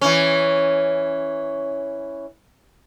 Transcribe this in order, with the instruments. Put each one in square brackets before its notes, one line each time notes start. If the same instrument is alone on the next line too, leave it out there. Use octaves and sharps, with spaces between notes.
[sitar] E3 C#4